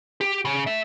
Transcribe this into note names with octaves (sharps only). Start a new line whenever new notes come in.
G4
C#3
A4 E5